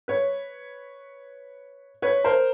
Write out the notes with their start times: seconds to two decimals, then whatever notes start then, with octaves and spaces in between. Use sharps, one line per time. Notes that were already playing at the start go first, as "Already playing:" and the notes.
0.08 B4 C#5
2.02 B4 C#5
2.24 A#4 C5